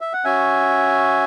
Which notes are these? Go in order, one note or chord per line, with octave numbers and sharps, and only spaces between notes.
E5
F#5
C#4 F#4 E5 G#5